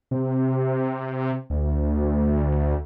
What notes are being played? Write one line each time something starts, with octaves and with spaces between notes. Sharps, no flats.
C3
D2